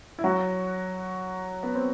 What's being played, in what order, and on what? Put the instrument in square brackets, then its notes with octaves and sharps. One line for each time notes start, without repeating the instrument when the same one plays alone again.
[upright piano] E4
F#3 F#4
B3
C4